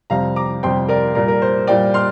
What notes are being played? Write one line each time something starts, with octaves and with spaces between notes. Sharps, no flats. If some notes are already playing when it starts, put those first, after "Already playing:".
F2 C3 G3 C4 F5 A#5
A#5 D6
F2 C3 G3 C4 G5 C6
A#4 D5
A#2 G3 A#3 A#4
A#4
C5
A#2 G3 A#3 D5 G5
C6 F6